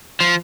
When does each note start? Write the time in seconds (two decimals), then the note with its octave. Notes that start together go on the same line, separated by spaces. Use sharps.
0.20 F3